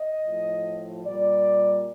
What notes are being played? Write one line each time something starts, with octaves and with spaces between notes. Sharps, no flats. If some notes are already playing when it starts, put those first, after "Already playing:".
Already playing: D#5
A2 F3
A#2 G3 D5